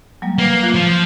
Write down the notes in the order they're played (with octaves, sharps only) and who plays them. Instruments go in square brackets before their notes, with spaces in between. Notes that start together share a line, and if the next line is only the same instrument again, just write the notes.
[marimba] F#3 G3 A#3
[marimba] F#3 B4 [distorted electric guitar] A#3
[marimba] F4 F5 F#6
[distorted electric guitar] F3